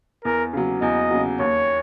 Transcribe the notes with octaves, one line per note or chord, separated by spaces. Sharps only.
E2 A#4
C#3 F#3
E2 D#5
C#3 F#3
D#2 C#5